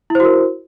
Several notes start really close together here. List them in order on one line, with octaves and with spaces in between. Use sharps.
E4 C5 F#4 A#4